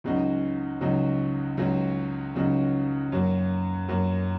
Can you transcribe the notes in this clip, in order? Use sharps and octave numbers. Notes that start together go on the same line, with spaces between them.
C#2 C#3 F#3 D#4 F#4
C#2 C#3 F#3 D#4 F#4
C#2 C#3 F#3 D#4 F#4
C#2 C#3 F#3 D#4 F#4
F#2 F#3 A#3 F#4
F#2 F#3 A#3 F#4